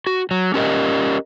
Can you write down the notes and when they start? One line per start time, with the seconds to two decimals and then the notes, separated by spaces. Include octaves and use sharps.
0.07 F#4
0.31 F#3
0.54 C#4 G4 A#4 D#5